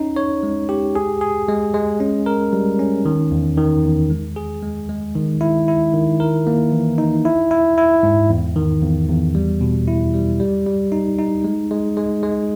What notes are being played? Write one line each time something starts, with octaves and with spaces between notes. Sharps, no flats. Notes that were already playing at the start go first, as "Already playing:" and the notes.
Already playing: C#4 D#4
C#5
G#3
G4
G#4
G#4
G#3
G#3
C#4
A#4
G3
C#4
D#3
E2
D#3
E2
G#3
G#4
G#3
G#3
D#3
E4
E4
D#3
A#4
A#3
E3
D#4
E4
E4
E4
G#2
E2
D#3
E2
E2
G3
B2
E4
G3
G3
G3
D#4
D#4
G#3
G#3
G#3
G#3